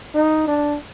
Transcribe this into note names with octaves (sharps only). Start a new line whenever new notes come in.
D#4
D4